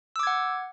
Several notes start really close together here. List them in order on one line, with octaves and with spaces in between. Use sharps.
E6 D6 G#6 F#5